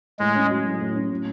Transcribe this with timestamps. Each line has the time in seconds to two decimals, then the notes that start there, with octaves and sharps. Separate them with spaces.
0.19 A2 G#3
0.35 C#4
0.50 F#3
0.65 A2
0.80 A2
0.95 C#4
1.10 A2